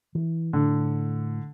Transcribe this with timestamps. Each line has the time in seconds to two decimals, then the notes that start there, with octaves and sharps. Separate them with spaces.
0.15 E3
0.53 A2 D3